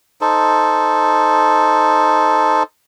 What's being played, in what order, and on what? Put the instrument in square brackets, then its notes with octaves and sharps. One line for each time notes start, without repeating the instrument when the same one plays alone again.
[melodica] D#4 A4 C5